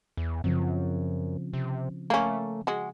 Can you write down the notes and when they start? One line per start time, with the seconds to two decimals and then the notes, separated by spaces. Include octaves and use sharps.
0.17 E2
0.44 F#2 C#3 F3 C4
1.53 C3
2.10 A3 A#3 C#4
2.67 G#3 F#4